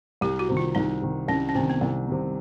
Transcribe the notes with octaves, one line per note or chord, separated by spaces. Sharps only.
C2 G4
F#4
C3 D#3
F4
C2 D#4
C3 D#3
C2 C#4
C#4
C3 D#3 C4
B3
C2 C4
C3 D#3